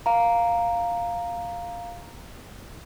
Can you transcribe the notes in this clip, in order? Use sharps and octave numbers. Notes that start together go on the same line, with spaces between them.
F5 A#5